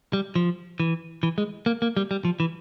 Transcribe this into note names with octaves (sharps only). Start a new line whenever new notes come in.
G3
F3
E3
E3
G#3
A#3
A#3
G3
G3
F3
E3